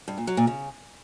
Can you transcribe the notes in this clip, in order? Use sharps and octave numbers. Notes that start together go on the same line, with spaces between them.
G2
A#2
F#3
A#2
C#3